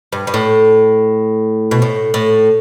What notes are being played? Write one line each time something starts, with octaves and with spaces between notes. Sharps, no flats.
G2
G2
A2
B2
A2
A2